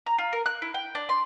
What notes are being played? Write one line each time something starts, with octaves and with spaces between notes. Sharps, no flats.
A#5
F4
A#4
F#6
E4
G5
D4
C6